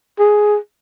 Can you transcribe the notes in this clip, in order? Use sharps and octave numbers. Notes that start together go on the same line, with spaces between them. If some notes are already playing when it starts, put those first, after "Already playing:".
G#4